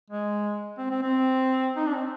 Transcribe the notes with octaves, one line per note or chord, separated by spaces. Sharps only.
G#3
C4
C4
C4
D#4
D4
C4